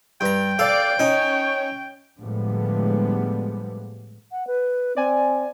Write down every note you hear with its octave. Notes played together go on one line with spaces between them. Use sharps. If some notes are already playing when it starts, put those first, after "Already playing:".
G2 G5 A#5
A4 D5 F5 D7
C#4 D#4 C#5
A2 D3 F3 G3 G#3 B3
F#5
B4
C4 D5 G#5